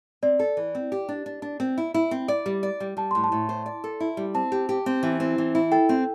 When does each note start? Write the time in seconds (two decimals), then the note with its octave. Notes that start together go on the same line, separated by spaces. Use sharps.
0.22 C4 D5
0.39 A4
0.57 E3
0.75 C4
0.92 G4
1.09 D4
1.26 D4
1.42 D4
1.60 C4
1.78 E4
1.94 E4
2.11 C4
2.28 D5
2.46 G3
2.63 D5
2.80 G3
2.97 G3 A5
3.11 A2 C6
3.24 A5
3.32 A2
3.49 C5
3.66 D5
3.84 A4
4.00 E4
4.17 G3
4.34 C4 A5
4.52 G4
4.69 G4
4.86 C4
5.03 E3
5.20 C4
5.38 E3
5.55 E4
5.72 A4 G5
5.89 C4